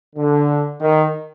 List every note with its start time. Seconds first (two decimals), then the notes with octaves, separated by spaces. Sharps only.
0.15 D3
0.80 D#3